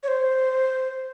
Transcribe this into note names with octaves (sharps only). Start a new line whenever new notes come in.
C#5
C5